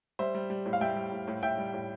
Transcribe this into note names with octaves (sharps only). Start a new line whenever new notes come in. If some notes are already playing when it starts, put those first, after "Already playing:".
G3 C5 E5
G3
G3
A2
F5
G3 E5 G5
G3
A2
A2
A2 E5 G5
G3
A2